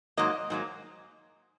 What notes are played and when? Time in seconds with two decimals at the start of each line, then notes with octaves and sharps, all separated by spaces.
0.17 G#2 F#3 A#3 D#5
0.50 G#2 F#3 A#3